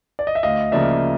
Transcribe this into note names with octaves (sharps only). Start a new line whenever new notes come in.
D5
D#5
E5
D2 D#5 F5
C#3 F3 A#3 D5 E5